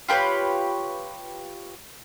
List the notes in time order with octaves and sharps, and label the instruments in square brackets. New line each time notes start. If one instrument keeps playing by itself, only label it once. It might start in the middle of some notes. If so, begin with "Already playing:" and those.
[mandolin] F4 G4 B4 C#5